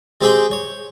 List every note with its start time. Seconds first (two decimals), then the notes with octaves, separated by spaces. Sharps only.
0.21 G#3 C4 G4 G#4 G5
0.51 C#5